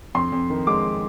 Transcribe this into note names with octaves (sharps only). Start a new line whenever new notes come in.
F2 C6
F2
D#3
G#3 D6